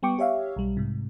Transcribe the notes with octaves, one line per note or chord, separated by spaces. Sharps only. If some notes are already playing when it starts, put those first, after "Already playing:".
G3 B3 G5 C#6 D6
G4 C#5 E5 F5
B1 G3
G#2 C3